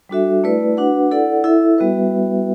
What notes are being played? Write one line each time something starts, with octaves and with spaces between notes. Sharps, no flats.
G3 D4 F#4 A4 E5
A3 E4 B4 D5
D4 F#4 B4 F#5
E4 A4 D5 F#5
E4 A4 E5
G3 B3 F#4 B4 E5